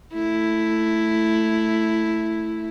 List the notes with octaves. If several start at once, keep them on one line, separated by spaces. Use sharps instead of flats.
A3 E4